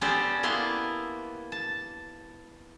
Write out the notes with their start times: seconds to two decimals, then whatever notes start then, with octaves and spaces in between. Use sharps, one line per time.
0.01 B3 C#4 G4 A4 C5 D5
0.43 A#3 B3 E4 A5 C6
1.52 A5